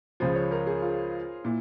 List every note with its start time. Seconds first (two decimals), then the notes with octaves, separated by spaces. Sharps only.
0.20 C#2 C#3 F3 C5
0.36 C#5
0.51 A#4
0.67 G#4
0.82 F4
1.44 A#2 E4